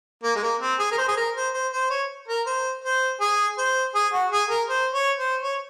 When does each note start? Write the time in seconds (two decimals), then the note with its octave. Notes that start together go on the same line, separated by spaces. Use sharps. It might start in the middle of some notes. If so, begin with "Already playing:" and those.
0.23 A#3
0.36 G#3
0.43 A#3
0.61 C4
0.79 G#4
0.92 A#4
0.98 C5
1.08 G#4
1.17 A#4
1.36 C5
1.54 C5
1.73 C5
1.90 C#5
2.28 A#4
2.47 C5
2.84 C5
3.21 G#4
3.58 C5
3.95 G#4
4.13 F#4
4.32 G#4
4.50 A#4
4.69 C5
4.94 C#5
5.18 C5
5.43 C#5